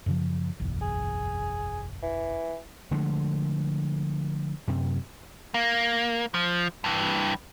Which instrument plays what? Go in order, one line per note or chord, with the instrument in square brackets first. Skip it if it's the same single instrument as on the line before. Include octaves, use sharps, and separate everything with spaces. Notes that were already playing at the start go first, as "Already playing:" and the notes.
[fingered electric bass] F#2 C#3 F3
F#1 B1 E2
[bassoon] G#4
E3
[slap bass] D3 F3 G#3 A3
F#2 C3
[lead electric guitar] A#3
F3
G2 E3